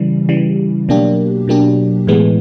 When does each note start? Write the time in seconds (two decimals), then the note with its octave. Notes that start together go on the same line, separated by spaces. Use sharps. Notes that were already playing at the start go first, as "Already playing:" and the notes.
Already playing: C#3 E3 G3
0.29 C#3 E3 G3
0.89 B2 F#3 A#3 D4 G4
1.48 B2 F#3 A#3 D4 G4
2.07 A2 E3 G#3 B3